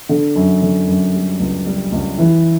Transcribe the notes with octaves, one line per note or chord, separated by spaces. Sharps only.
D3
F#2
D3
F#2
G3
C#2
G3
C#2
E3